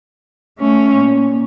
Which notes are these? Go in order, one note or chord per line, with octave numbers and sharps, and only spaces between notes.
A3 C#4
A#2